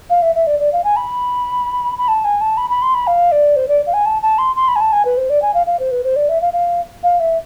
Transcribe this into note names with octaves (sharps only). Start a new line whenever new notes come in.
F5
E5
E5
D5
D5
F5
G#5
B5
B5
A5
G#5
A5
B5
B5
C6
B5
F5
D5
C5
D5
F5
G#5
A5
A5
C6
C6
B5
G#5
A5
G#5
B4
C5
D5
G#5
F5
F5
C5
B4
C5
D5
E5
F5
F5
F5
E5